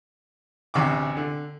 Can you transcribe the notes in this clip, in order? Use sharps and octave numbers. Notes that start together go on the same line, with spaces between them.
A1 D2 C3 C#6 D6
D3